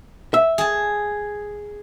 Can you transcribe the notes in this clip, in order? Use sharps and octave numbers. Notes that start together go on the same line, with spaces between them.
E5
G#4 A5